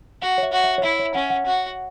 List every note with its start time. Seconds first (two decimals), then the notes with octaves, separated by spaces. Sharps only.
0.22 F#4 F#5
0.38 C#5
0.43 E5
0.53 F#4
0.64 E5
0.78 C#5
0.83 E4 E5
0.99 C#5
1.15 C#4 F#5
1.30 F#5
1.46 F#4